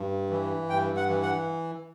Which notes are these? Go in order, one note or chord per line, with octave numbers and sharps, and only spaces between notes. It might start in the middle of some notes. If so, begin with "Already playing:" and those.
Already playing: G2
E3
G2 G5
F#5
E3
F#5